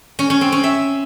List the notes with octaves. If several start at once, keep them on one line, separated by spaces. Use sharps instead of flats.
C#4
C#4
C4
C#4
E5